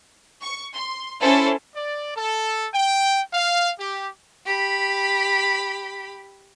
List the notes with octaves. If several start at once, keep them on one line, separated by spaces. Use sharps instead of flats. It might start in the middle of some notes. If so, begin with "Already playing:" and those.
C#6
C6
C#4 E4 A4 C5
D5
A4
G5
F5
G4
G4 B5